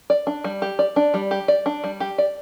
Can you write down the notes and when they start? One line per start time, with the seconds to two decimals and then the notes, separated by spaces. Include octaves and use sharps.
0.10 D5
0.27 D4
0.44 G3
0.62 G4
0.79 D5
0.96 D4
1.14 G3
1.31 G4
1.48 D5
1.66 D4
1.84 G3
2.00 G4
2.18 D5